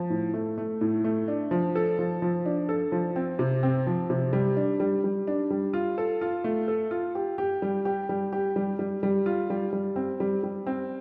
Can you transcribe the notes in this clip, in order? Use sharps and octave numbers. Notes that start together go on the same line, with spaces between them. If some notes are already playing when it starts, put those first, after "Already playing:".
Already playing: F3
A2
A3
A3
A2
A3
D4
F3
A4
F3
F3
D4
A4
F3
C4
C3
C4
F3
C3
G3
D4
G3
G3
D4
G3
F4
A4
F4
A3
A4
F4
G4
G4
G3
G4
G3
G4
G3
G3
G3
F4
G3
G3
C4
G3
G3
C4